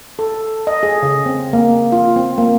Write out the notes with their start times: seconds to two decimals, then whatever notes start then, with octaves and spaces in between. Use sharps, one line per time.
0.19 A4
0.67 D#5
0.83 G#4
1.03 C#3
1.26 C4
1.53 A#3
1.92 F4
2.16 C4
2.38 A#3